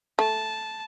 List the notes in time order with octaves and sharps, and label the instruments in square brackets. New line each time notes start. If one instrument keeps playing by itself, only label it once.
[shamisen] A3 [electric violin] A5